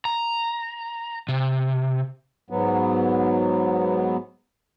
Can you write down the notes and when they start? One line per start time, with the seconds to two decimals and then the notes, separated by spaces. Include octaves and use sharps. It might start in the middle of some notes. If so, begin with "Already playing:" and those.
0.05 A#5
1.28 C3
2.50 G#2 F#3 B3